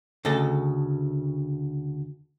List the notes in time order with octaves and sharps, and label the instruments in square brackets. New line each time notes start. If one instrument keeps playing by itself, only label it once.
[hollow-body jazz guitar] D2 C#3 A4 D#5